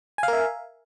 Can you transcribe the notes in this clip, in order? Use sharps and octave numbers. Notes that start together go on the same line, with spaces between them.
A#4 E5 F5 G#5